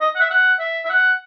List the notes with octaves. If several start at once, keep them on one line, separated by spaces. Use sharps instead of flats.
D#5
F#5
E5
F#5
E5
E5
F#5